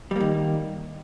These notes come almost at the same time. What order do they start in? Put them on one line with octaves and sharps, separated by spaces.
G3 A#3 D#3